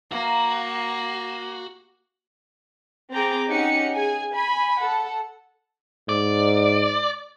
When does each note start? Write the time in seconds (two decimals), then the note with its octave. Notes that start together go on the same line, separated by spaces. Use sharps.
0.12 A#3 F#4 F5 A#5
3.11 C4 G#4 G5 A#5 D6
3.50 C#4 D#4 G4 F#5 C#7
3.92 G#4 G#5
4.34 G#5 B5
4.78 A4 F#5
6.09 G#2 D5